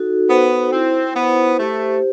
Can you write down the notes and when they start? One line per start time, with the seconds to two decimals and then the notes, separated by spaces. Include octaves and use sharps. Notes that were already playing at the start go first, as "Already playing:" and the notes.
Already playing: D#4 F#4 A4
0.29 B3 C5
0.72 C4 E4
1.16 B3 C5
1.59 A3 G4